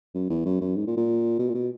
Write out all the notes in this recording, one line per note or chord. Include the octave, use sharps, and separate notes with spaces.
F#2
E2
F#2
F#2
G#2
A#2
A#2
B2
A#2
B2